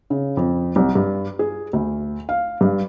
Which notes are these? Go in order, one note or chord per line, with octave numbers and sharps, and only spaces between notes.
C#3
F2
C2
G2
G#4
D2
F5
G2